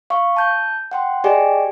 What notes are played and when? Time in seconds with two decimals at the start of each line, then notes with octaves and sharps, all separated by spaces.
0.10 F5 C#6
0.36 A5 G6
0.91 F#5 G5 C6
1.24 G4 G#4 D5 D#5 G5 G#5